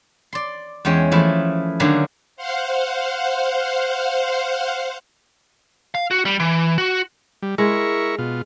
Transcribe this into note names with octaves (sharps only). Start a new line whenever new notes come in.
D5 C6
E2 G#3 C#4 G5
E3 F3 A3 E4
D3 D#3 F#3 A#3 G#4
C5 F5 F#5
F5
F#4
G3
E3
F#4
G3
G#3 E4 A#4 C#6
B2 F4